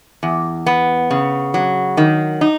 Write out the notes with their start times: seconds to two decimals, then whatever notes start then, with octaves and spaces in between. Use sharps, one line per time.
0.23 E2
0.66 B3
1.11 C#3
1.54 F#3
1.97 D#3
2.41 D#4